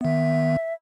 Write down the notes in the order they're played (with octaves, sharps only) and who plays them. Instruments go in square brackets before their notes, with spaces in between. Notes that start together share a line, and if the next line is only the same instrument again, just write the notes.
[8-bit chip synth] D#3 B3 [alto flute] E5